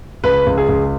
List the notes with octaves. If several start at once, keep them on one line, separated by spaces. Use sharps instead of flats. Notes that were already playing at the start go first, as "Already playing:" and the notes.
C#2 B4
C#2
G#4
C#2